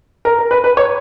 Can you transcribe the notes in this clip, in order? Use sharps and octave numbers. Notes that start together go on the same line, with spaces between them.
A#4
A#4
B4
B4
C#5